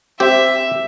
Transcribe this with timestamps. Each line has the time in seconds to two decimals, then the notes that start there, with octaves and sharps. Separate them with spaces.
0.20 C4 G4 E5